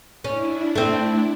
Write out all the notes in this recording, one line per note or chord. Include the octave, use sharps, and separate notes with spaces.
C#4 D4 E4
A3 C4